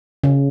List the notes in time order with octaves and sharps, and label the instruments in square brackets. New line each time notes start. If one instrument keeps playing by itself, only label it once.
[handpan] C#3